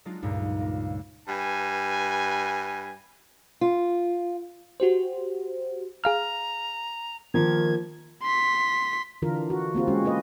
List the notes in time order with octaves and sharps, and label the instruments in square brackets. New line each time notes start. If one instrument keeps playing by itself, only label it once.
[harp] F#3 G#3 D4 D#4 F4
C#2 G2 A#2 D#4
A#3
[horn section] G2 B4 G#5
[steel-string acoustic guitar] F4
[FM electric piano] F#4 G4 C5
[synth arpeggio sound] G#4 F5 F6 [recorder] A#5
[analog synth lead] D#3 [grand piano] F3 A#3 [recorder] G#6
[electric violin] C6 B6
[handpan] D3 E3 D4 F4 A#4
F#4
A#3 C4 F4 G4
G#3 C#4 F#4
A#3 F4 B4 D#5